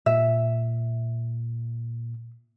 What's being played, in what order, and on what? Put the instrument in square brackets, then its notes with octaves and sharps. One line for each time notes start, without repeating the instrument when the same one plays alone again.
[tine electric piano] A#2 [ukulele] E5